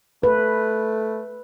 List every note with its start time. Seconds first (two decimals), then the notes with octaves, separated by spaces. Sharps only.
0.23 A3 B4